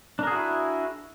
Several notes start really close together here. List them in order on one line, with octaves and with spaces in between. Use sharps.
D4 A#4 G#4 F#4 E4